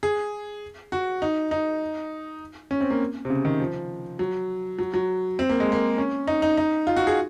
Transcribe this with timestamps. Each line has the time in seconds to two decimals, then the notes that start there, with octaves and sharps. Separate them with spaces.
0.03 G#4
0.92 F#4
1.22 D#4
1.51 D#4
2.71 C#4
2.81 C4
2.90 A#3
3.25 C3
3.30 C#3
3.45 D#3
3.60 F3
4.19 F#3
4.79 F#3
4.94 F#3
5.39 C4
5.49 A#3
5.60 G#3
5.72 A#3
5.98 C#4
6.28 D#4
6.42 D#4
6.57 D#4
6.87 F4
6.97 F#4
7.07 G#4